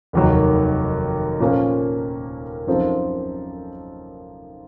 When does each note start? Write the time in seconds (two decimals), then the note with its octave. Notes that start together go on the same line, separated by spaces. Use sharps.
0.13 F1 D#2 D#3 F#3
1.40 A#2 F3 A#3 C#4 A4
2.67 F#2 F3 C4 D#4 A4